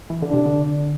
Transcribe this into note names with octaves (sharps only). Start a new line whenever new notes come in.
E3
D3 D4
C3
D3